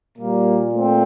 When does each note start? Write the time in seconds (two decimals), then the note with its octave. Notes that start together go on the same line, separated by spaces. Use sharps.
0.18 A#2 G3 A#3
0.74 A3 C4